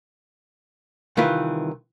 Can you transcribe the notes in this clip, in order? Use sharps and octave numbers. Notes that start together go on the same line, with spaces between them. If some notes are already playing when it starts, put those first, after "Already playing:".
C2 D#3 E3 F4 B4